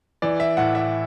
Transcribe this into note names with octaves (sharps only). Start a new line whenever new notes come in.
E3 D5
E5
A2 F#5
E5